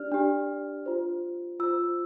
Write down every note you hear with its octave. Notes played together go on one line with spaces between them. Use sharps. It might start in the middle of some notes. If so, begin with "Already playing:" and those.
Already playing: D4 G4 D5 F6
D4 G4 D5
F4 C5
F4 C5 E6